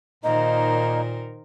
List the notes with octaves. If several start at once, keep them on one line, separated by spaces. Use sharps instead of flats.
A#2 D#3 A#3 D#4 A#4 C5 D#5